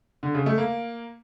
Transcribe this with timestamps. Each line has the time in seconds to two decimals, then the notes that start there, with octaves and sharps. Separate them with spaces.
0.23 D3
0.35 C#3
0.46 A3
0.58 A#3